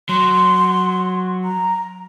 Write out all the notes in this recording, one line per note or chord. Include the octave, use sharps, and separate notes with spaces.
F#3 C6
A#5